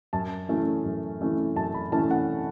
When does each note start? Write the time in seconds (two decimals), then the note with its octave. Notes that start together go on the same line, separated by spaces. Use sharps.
0.13 F#2 A5
0.49 E3 A3 C#4
0.85 F#2
1.21 E3 A3 C#4
1.56 F#2 A5
1.74 B5
1.92 E3 A3 C#4 A5
2.11 F#5